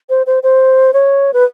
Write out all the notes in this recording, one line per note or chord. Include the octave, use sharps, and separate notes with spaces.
C5
C5
C5
C#5
B4